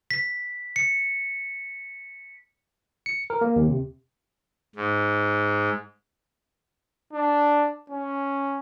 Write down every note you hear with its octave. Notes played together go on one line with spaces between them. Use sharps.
B6
C#7
C#7
A#4
A#3
D#2
C3
G#2
D4
C#4